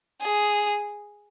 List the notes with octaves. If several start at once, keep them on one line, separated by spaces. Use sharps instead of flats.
G#4